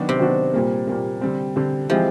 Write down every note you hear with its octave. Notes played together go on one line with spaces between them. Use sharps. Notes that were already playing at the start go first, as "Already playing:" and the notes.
Already playing: D#3 F#3 B3 D4 F#4
C3
D#3 F#3 B3 D4 F#4
A#2 G3 A#3
A#2 G3 A#3
D3 G3 C4
D3 G3 C4
E3 F3 G#3 C4 E4 G4